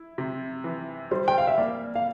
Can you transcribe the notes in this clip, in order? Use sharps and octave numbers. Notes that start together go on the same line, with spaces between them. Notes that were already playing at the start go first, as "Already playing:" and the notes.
Already playing: E4
C3
E3
G3 C5
G5
F5
E5
A#3 D5
F5